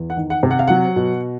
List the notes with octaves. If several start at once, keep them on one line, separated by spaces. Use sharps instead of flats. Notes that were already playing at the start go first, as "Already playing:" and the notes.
Already playing: E2
F#5
D#3
F#5
C3
F#5
F5
F#3 F#5
B2